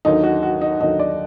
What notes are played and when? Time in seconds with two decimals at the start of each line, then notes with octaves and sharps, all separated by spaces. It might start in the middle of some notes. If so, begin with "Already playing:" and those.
0.05 D#2 D3 F#3 D#4
0.24 F#4
0.43 F#4
0.61 D#4
0.81 D#2 D3 F#3 D#4
0.99 D5